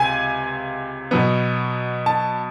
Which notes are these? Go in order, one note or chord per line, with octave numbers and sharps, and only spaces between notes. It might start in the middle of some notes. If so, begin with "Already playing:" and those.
Already playing: C#2 C3 G#5
B2 F#3 B3
A5